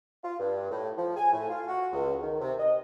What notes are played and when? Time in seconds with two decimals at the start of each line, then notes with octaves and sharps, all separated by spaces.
0.23 F4
0.39 G2
0.71 A2
0.97 F3
1.16 G#5
1.32 A2
1.49 F4
1.68 F#4
1.92 C#2
2.23 D#3
2.41 C3
2.59 D#5